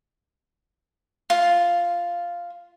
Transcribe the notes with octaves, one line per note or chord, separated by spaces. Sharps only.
F4